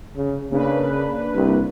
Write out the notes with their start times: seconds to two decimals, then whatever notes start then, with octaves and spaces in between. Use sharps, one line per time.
0.16 C#3
0.51 C#3 A#3 D4 B4
1.35 C2